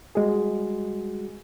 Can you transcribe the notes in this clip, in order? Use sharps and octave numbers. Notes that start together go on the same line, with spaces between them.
G3 G#3 F#4 G#4